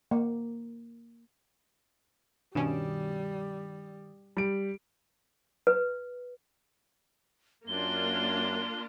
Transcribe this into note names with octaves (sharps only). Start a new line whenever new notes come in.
A#3
G2 B2 D#3 G3 C#4
G3 D7
B4
F#2 A#3 D4 F4 G7